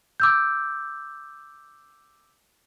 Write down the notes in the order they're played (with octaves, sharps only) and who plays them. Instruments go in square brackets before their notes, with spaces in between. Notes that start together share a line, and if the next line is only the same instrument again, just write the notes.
[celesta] D6 E6 G6